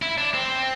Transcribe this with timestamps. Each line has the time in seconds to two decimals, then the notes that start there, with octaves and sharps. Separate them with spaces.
0.02 E4
0.18 D4
0.34 C4